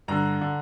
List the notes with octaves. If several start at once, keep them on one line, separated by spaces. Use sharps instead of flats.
G2 D3 A#5
D3